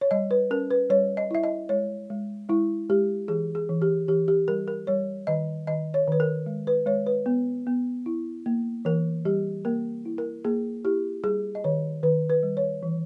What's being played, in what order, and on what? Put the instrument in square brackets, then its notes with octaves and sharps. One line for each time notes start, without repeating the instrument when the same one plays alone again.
[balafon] C#5
G3 D#5
B4
C#4 A#4
B4
G3 C#5
D#5
E4 E5
D#5
G#3 C#5
G#3
G#3 E4
G#3 G4
E3 G#4
G#4
E3
G4
E3 G4
G4
G3 A#4
A#4
G3 C#5
D#3 D#5
D#3 D#5
C#5
D#3 B4
A#4
G#3
B4
G#3 C#5
B4
B3
B3
E4
A#3
E3 A#4
G3 G4
A#3 A#4
E4
A#4
A#3 G#4
E4 G4
G3 G#4
D#5
D#3 C#5
D#3 B4
B4
G3
C#5
E3